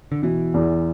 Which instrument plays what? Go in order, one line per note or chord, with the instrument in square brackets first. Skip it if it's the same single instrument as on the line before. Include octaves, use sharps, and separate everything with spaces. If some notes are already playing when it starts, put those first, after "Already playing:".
[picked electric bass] D3
[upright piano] B2 [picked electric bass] E3
[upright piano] E2